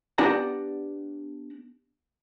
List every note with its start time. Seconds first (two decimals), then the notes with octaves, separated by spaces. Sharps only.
0.18 B3 D4 G4 D5 F#5 A#5